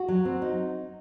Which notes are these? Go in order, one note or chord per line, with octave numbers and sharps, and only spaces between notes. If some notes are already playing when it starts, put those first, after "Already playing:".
Already playing: F#4
F#3
C4
D#4